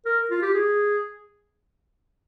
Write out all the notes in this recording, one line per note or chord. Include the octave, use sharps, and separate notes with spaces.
A#4
F4
G4
G#4